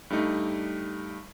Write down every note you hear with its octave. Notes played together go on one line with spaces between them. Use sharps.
G2 G3 A3 D#4